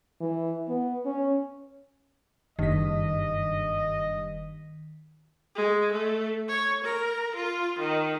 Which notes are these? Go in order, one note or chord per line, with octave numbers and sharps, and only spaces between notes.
E3
B3
C#4
F#1 G2 D#3 D#5 B6
G#3
A3
C#5
A#4
F4
D#3